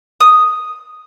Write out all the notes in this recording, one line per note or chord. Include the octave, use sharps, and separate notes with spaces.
D#6